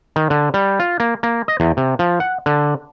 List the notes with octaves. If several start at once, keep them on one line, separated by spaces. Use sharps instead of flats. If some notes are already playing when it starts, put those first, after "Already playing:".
D#3
D3
G3
F4
A#3
A#3
D#5
E2
C3
F3
F#5
D3